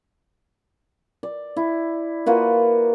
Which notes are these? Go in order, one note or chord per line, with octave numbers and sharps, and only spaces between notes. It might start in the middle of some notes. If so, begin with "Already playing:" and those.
D5
E4
A#3 F4 F#4 B4